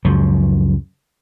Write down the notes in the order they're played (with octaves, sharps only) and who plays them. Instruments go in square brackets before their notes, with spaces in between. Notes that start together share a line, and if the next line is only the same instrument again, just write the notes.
[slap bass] C#2 F#2 F3 F#3